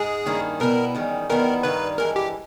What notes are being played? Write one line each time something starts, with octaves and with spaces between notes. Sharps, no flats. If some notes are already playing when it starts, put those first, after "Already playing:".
Already playing: G#2 G#3 G#4
G2 D#3 A#3 C#4 E4
B2 G3 B3 E4 A#4
E2 D#3 G3 C#4
E2 D#3 G3 B3 E4 A#4
G2 D#3 G3 A#3 B4
G2 E3 G#3 A#4
G4